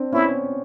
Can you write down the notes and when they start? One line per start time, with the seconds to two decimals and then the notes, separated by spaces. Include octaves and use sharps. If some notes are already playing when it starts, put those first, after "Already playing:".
Already playing: C4 D4
0.12 B3 C#4 E4